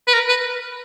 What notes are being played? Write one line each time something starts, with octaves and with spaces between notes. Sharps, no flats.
B4
A#4
B4